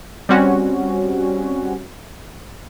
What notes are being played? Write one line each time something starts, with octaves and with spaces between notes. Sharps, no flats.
G3 C4 C#4 F#4